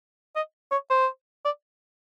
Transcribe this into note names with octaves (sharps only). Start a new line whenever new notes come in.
D#5
C#5
C5
D5